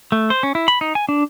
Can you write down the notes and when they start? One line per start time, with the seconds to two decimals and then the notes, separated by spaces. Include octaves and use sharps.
0.12 A3
0.30 C5
0.43 C#4
0.55 E4
0.68 B5
0.81 D#4
0.95 G#5
1.09 D4